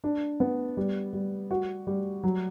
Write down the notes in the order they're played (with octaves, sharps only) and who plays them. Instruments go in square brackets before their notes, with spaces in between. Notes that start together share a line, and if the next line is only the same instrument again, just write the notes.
[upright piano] D4
B3
G3
G3
F#4
G3
F#3